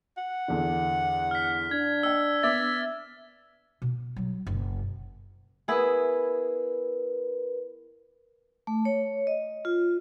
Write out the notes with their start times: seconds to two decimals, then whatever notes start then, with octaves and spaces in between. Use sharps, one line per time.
0.17 F#5
0.48 E2 D3
1.31 F6 B6
1.71 D4 G#6
2.03 D#5 G5 E6
2.43 B3 E5 D6 A6
3.82 B2
4.16 F#3 G3
4.47 F#1 B2
5.68 B3 E4 G#4 A#4 B4
8.67 A3
8.85 C#5
9.27 D#5
9.65 F4